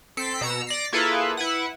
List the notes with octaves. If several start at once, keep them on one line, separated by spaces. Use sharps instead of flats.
C4 A4 B6 C7 D7
B2 A#5 E6 C#7 E7
D5 A#6 C7
A#3 E4 F4 G#4 A4 B4
E4 B4 F#5